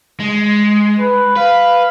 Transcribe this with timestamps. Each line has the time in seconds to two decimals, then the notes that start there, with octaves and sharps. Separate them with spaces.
0.20 G#3
0.99 B4
1.36 B4 F5